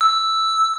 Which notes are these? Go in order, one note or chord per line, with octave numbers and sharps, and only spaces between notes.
E6